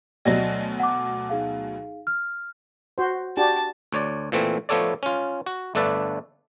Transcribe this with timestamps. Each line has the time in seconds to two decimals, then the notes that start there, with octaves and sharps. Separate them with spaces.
0.25 D2 B2 F#3 D5 D#5 A#6
0.80 F#5 D6
1.30 D#4 G#4 F5
2.07 F6
2.98 F#4 C5
3.37 D4 F#4 G4 A5
3.92 D2 C#5 D5
4.32 A#2 E3 A3 C4
4.69 F3 A3 B3 A4 C#5 D5
5.03 C#4 F4
5.46 F#4
5.75 G1 A3 D4 A4 B4 D5